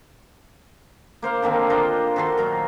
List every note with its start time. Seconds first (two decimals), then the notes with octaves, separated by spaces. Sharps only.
1.22 A#3 C5 F5
1.42 D3 D#3 A#3 C4
1.70 D4 F4 C5 D#5
2.16 D#3 F#4 A4 C6
2.37 A#2 F#3 A#4